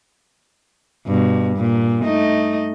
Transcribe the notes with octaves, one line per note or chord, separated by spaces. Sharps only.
G2 B2
A#2
A3 D#4 D#5